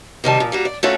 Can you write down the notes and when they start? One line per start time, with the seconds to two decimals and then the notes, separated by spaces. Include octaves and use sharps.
0.24 C3 D#3 G3 A5
0.40 A#2 F3
0.52 G3 A#3 F#4
0.65 D5
0.83 A3 A#3 C#4 F4 F#4 A4